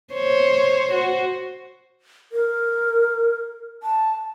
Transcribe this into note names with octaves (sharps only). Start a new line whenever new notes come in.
C5 C#5
F#4 C5
A#4
A5